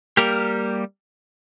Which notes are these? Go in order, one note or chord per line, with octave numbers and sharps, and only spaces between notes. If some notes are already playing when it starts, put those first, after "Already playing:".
G3 A#3 G4 A#4